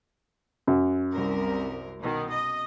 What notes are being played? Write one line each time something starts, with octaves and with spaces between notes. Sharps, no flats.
F#2
C2 A#4
B2 D#3
D#5